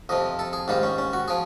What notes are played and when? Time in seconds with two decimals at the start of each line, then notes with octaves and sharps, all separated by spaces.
0.09 F2 C3 F3 D#5
0.39 A4
0.53 G#4
0.68 G#2 D#3 G3 F4
0.83 C#4
0.98 C#4
1.13 F#4
1.28 F3 G#4